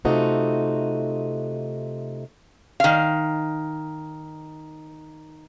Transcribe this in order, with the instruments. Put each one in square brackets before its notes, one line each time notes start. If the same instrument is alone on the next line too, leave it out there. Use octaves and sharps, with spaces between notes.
[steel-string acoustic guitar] C3 A3 D#4 F4 F#4
[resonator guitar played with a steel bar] D#3 F5